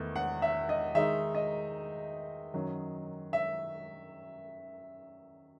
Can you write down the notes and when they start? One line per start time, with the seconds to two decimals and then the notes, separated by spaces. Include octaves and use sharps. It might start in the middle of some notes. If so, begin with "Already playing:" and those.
Already playing: E2 D#3 A3
0.16 F#5
0.42 E5
0.69 D#5
0.95 D#3 G#3 D#4 E5
1.35 D#5
2.54 F#2 D#3 F#3
3.33 E5